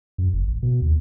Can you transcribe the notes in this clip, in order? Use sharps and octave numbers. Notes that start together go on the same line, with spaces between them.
F#2
F#1
A1
B2
D#2